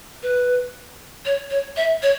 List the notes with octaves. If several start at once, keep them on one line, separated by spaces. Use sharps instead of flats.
B4
C#5
C#5
E5
C#5